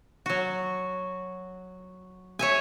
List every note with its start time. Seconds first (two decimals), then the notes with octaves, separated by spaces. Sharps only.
0.26 F#3 F#4
2.39 C#5 E5 G#5